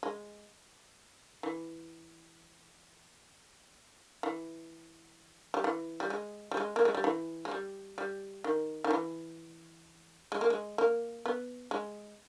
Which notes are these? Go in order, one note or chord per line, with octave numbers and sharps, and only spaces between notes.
G#3
E3
E3
G3
E3
G3
G#3
G3
G#3
A#3
G#3
G3
E3
G#3
G3
G3
D#3
D#3
E3
G#3
A#3
G#3
A#3
B3
G#3